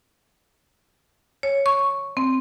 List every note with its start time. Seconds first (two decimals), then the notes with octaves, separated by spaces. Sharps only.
1.43 C#5
1.66 C#6
2.17 C4